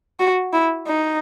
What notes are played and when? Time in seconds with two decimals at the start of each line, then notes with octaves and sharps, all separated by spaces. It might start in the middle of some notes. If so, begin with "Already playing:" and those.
0.20 F#4
0.53 E4
0.87 D#4